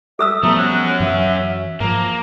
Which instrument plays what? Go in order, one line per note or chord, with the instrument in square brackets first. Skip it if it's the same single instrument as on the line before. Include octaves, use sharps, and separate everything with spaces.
[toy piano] A4 D#6 E6 [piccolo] E5
[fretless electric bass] F3 G3 B3 [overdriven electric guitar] A3 [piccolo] A#5
[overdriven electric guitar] C#4 F#4 [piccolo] F#6
[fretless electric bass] F#2 E3 F#3 [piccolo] E5
[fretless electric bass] G#2 F3 [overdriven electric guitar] A#3 [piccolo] A#5